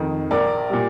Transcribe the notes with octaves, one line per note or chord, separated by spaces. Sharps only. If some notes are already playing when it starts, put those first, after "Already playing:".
Already playing: F2 D#3
A#1 A#4 D5
A#2 G3